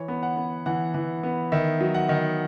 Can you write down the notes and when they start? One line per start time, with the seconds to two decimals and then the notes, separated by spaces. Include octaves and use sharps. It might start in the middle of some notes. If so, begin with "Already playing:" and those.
Already playing: E3 C#5
0.08 B3
0.23 F#5
0.37 B3
0.66 E3 F#5
0.94 E3
1.23 B3
1.52 D#3 E5
1.81 F#3
1.94 F#5
2.09 D#3